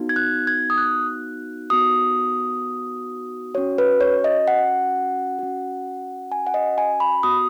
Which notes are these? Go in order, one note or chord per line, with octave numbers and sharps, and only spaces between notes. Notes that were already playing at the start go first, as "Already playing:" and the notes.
Already playing: B3 D#4 F#4
G#6
F#6
G#6
D#6
F#6
B3 D#4 F#4 D#6
C#4 F#4 C#5
B4
C#5
D#5
F#5
C#4 F#4
G#5
F#5
D#5
G#5
B5
B3 F#4 D#6